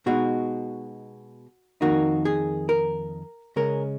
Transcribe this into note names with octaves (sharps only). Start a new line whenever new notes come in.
B2 G#3 D#4 F#4
F2 D#3 A#3 D#4 F#4
G#4
A#4
C#3 G#3 C#4 A#4